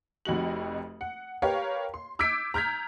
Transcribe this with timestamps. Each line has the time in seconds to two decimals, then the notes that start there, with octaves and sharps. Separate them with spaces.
0.25 F1 F2 D#4 F#4 F#7
1.01 F#5
1.42 G4 A#4 B4 C#5 F5
1.94 C6
2.19 D6 E6 G6 G#6 B6 D7
2.54 A#5 F6 G6 G#6 B6